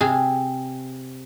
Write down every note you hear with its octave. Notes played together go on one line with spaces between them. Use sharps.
C3 G#4